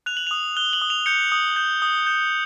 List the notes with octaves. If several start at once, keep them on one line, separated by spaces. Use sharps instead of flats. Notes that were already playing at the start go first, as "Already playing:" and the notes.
F#6 F7
F#7
D#6 F7
F#6 G7
F#7
D#6
F7
G6 C#7
D#6
G6
D#6
G6